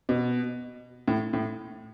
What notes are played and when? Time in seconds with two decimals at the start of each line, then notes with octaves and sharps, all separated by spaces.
0.09 B2
1.08 A2
1.33 A2